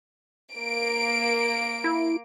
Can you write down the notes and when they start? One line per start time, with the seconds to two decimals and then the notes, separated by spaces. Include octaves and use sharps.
0.53 A#3 D7
1.84 E4